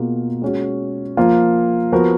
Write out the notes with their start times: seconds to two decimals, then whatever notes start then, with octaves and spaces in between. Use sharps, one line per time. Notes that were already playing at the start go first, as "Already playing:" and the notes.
Already playing: B2 A#3 F4 G#4
0.42 G#3 C#4 F#4
1.17 F3 A#3 F4
1.92 F3 B3 F#4 A#4